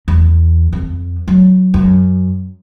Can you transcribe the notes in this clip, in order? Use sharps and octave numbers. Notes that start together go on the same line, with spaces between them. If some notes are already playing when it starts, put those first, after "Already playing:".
E2
F2
F#3
F#2